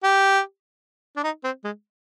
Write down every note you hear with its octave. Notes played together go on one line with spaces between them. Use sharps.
G4
D4
D#4
C4
G#3